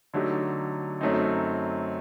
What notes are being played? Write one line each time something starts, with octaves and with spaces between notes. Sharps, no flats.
D3 F#3 A3 D#4 G4
F#2 F#3 A3 C4 D#4